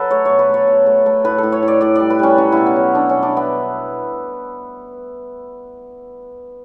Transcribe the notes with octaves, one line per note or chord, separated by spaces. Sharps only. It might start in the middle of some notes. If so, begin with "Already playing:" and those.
Already playing: F#3 A4 B4
A3 C#5
B2 C#5
B4
A3 C#5
B2
A3
A3
A2 B4
A2 A4
C#5
A2
D5
A2 D5
G3 D5
B4
G3 C#4
F#3 C#4
B2 E4
B3
F#3
A3 D4
B2 C#4
D4
A3 B3